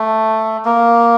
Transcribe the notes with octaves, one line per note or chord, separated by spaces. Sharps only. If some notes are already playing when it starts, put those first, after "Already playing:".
Already playing: A3
A#3